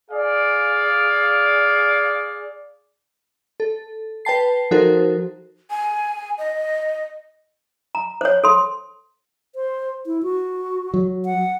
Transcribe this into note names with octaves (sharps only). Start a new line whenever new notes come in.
G#4 D5 F5
A4
B4 G5 A5 C7
F3 D#4 F#4 A4 A#4 C5
G#5
D#5
A#5
C5 C#5
A4 C6
C5
E4
F#4
F#3
F#5